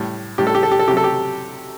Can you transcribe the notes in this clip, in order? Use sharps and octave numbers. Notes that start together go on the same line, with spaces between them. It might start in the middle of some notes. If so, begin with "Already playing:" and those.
Already playing: A2 G3
A2 G3 G4
A4
G4
A4
G4
A4
C3 F#3 G4
A4
G4